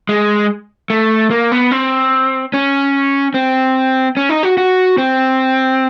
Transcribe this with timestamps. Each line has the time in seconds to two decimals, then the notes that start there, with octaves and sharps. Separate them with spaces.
0.09 G#3
0.90 A3
1.31 A#3
1.52 B3
1.71 C4
2.54 C#4
3.34 C4
4.17 C#4
4.29 D#4
4.43 F#4
4.58 F#4
4.98 C4